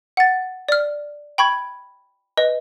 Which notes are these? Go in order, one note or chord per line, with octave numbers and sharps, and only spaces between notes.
F#5 A6
D5 F6
G5 B5 C#6 G#6
B4 D#5